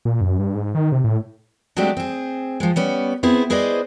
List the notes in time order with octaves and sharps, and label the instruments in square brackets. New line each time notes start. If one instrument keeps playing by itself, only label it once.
[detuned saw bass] A#2
F#2
G2
G#2
D#3
C3
A2
[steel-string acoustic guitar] F#3 G#3 A3 C4 D4 G4
C4 G#4
F3 G#3
G3 B3 C#4
B3 C4 E4 G#4
E4 G#4 B4 C5 D5 D#5